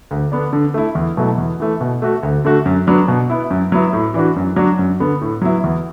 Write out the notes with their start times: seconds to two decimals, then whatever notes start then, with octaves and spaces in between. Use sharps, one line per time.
0.11 D2
0.32 D3 B3 D4
0.53 D3
0.74 A3 E4
0.95 E2
1.17 B2 F#3 A3 E4
1.38 E2
1.60 E3 A3
1.81 B2
2.02 A3 F#4
2.23 D2
2.45 D3 A3 F#4
2.66 F#2
2.87 F#3 B3 D4
3.08 B2
3.30 B3 E4
3.50 F#2
3.72 F#3 B3 E4
3.93 A2
4.14 E3 D4 F#4
4.36 F#2
4.56 F#3 D4 F#4
4.79 F#2
5.00 D3 B3
5.21 A2
5.42 F#3 B3 E4
5.64 E2